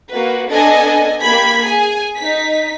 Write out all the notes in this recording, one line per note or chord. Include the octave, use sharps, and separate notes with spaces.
A#3 F#4 B4
B3 D4 A4 D#5 G#5
A#3 G4 B5 G#6 B6
G#4 G#5
D#4 B6